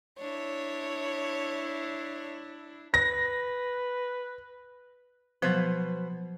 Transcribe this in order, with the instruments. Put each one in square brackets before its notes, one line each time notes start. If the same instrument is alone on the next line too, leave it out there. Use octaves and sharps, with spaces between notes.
[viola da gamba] D4 E4 [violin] C#5
[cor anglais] B4 [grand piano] A#6
[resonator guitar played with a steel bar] B2 B4 C5 [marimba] F3 F#3